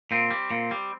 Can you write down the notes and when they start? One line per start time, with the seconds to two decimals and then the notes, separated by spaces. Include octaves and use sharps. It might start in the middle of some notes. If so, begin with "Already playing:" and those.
0.11 A#2 C4
0.30 G3
0.51 A#2
0.71 G3